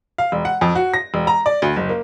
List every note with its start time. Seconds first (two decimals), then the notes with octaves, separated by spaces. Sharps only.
0.18 F5
0.32 E1
0.45 F#5
0.61 F2
0.75 F#4
0.94 A#6
1.14 E1
1.27 A#5
1.46 D5
1.62 D2
1.76 F#1
1.89 A#3